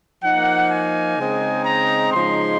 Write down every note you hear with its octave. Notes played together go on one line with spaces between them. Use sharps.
F3 A#3 D#4 F#5
G#5
C#3 G#3 C4 D#4
A#5
C#3 F3 G#3 D#4 C6